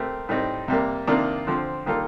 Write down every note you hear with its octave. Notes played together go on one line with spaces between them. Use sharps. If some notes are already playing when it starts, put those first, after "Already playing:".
Already playing: A3 C4 G4 A#4
A2 G3 C4 D#4
C3 G3 A#3
C3 D#3 A#3 D4 F4
D3 F3 C4
D#3 G3 A#3 F4 A4